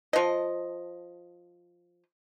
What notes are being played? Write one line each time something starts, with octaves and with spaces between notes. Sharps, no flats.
F3 D#5